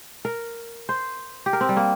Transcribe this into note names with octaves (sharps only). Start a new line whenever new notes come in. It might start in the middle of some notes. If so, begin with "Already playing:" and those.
A#4
C5
G4
A#4
C4
G3
A#3